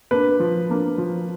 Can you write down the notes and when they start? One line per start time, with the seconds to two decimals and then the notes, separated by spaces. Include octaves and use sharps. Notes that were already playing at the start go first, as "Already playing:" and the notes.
0.11 A#3 D4 B4
0.40 F3
0.70 A#3 D4
0.98 F3